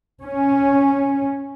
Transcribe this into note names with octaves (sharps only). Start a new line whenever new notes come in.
C#4